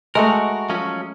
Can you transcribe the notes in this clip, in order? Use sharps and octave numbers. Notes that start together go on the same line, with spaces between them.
G#3 A3 F#4 A#4
F3 F#3 C#4